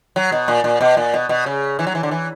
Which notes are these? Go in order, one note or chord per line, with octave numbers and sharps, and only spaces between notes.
F#3
B2
A#2
A#2
B2
A#2
B2
B2
C#3
E3
F#3
E3
D3
E3